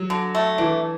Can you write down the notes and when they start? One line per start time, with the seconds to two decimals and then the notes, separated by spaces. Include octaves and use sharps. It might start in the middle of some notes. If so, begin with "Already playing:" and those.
Already playing: F#3
0.10 D3
0.35 A3
0.58 E3 D4